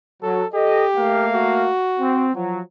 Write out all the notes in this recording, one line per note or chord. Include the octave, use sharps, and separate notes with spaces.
F#3 A4
G4 A4 D#5
A3 A#3 F5
F#4
C4
F3 F#3